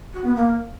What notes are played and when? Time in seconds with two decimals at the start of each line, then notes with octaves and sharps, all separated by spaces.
0.13 F#4
0.24 B3
0.35 A#3